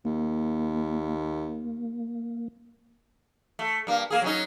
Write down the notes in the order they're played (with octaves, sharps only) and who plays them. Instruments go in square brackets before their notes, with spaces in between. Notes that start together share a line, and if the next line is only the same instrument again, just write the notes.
[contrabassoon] D#2 [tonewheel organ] A#3
[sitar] A3
G2 A#3
A#3 G#4
F#3 C#4 D#4